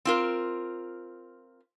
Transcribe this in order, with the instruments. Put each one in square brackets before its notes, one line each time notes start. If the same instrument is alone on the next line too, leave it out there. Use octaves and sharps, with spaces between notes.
[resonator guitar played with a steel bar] C4 F4 A#4